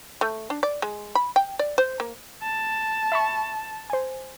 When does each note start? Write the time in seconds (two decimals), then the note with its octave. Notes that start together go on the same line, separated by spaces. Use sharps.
0.21 A3
0.50 D4
0.63 D5
0.82 G#3
1.15 B5
1.36 G5
1.59 D5
1.78 C5
2.00 A#3
2.42 A5
3.12 E5 B5 C#6
3.90 C5 G#5